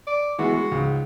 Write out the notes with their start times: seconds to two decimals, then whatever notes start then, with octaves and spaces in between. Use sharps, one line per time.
0.07 D5
0.38 E3 G#3 B3 F#4
0.53 G#3
0.72 C#2 G#2